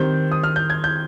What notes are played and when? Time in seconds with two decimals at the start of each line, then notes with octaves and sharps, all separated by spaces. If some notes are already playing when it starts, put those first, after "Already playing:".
Already playing: D#3 G3 C4 G6
0.32 D#6
0.43 F6
0.56 G6
0.70 G#6
0.84 G6